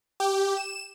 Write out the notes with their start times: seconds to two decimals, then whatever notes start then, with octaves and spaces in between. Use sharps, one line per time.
0.20 G4
0.57 E7